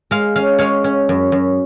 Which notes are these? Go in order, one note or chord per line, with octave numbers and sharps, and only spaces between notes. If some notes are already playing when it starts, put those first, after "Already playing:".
G#3 F5
C#4 F5
G#3 C#5 F5
C#4
F#2
F#2